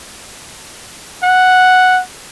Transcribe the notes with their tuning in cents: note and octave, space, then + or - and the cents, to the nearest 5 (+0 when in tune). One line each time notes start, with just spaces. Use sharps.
F#5 -5